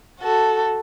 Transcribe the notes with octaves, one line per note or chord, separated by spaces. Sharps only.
F#4 A4